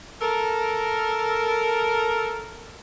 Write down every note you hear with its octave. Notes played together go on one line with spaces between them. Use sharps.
A4 A#4